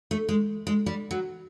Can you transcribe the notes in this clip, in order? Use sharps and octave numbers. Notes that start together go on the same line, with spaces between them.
A3
G#3
G#3
G3
F#3